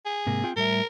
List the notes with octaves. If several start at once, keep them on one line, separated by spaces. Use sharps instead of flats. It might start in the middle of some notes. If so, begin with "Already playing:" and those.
G#4
G#2 C3 A#3
C4 F4 G5
A2 G3 A#4 E5